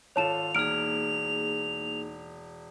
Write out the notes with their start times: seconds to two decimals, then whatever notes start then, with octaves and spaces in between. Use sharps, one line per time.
0.16 G#1 F4 A4 C#5 A5 E7 F7
0.55 E1 A#3 D#4 G#4 F6 D7